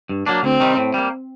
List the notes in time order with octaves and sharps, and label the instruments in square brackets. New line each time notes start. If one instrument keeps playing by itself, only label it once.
[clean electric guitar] G2
F#3 A#3 D4
[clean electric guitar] D2 [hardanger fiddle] C4
[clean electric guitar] C3 D#3 G3
A2
G3 A#3